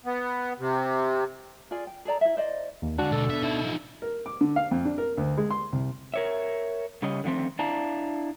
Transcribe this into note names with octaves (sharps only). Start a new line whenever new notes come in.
B3
C3
F4 G#4 D5 G#5
G5
G#4 A4 D5 A#5
E4 E5
C5 D5 D#5
D#2
D3 G#3 D4 F#4
B2 A4
B2 E5
D#4 E5
B1 F3
A#4
D6
D3
F5
F2
D4
A#4
D2
G#3
C6
C2
A#4 C#5 E5
C#3 G3 C#4 D#5
D3 D#3 F3 A3 C4
D4 E4 D5 F5 A5 A#5